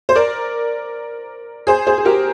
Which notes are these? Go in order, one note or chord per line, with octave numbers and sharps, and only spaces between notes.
C5
A#4 D5
G#4 C5
G#4 C5
G#4
G4 A#4